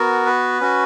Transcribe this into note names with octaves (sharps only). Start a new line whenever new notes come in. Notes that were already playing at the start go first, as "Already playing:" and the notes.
Already playing: B3 F#4 A#4
B4
C#4 F#4